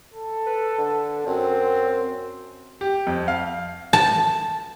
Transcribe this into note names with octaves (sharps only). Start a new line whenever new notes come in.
A4
B4
D3
F#2 C4
G4
F2
F5
A5